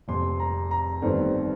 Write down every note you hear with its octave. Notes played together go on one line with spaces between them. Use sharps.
F1 F2 C3 C6
A#5
A#5
G1 G2 D#3 A3 C4